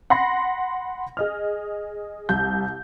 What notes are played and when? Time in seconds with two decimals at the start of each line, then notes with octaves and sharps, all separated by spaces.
0.10 F#5 B5 C6 A#6
1.17 G#4 D#5 F6
2.29 C2 G6